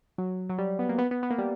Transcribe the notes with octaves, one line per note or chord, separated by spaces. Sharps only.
F#3
F#3
G3
B3
A#3
B3
B3
B3
A#3
G3